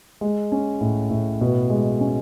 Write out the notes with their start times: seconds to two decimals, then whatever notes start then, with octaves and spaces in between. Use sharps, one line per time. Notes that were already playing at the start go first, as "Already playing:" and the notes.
0.21 G#3
0.52 C#4
0.81 A2
1.10 A2
1.41 B2
1.70 G#3
2.00 C#4